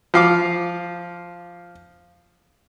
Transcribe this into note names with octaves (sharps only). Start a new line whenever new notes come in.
F3 F5 D6